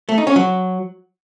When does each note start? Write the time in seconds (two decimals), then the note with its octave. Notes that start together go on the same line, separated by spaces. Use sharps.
0.09 A3
0.18 D#4
0.27 C#4
0.36 F#3